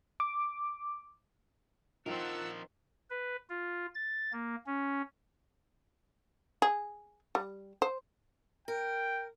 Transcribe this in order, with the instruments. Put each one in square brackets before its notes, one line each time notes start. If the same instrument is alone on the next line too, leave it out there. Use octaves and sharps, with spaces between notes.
[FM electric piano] D6
[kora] D#3 C4 [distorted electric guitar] F3 A#4 [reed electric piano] F4 [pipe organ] F#5 A5 E6
[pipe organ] B4
F4
A6
A#3
C#4
[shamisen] G#4
G3
C5
[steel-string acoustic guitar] A#4 [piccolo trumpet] G5